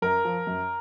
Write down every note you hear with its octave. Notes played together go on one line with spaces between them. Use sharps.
F#2 A#4
F3
F#2